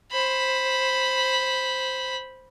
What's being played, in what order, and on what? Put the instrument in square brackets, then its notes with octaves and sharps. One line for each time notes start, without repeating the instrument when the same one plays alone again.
[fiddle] C5 B5